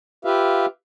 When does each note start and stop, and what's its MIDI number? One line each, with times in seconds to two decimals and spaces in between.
0.25 0.66 65
0.25 0.66 67
0.25 0.66 71
0.25 0.66 76
0.25 0.66 77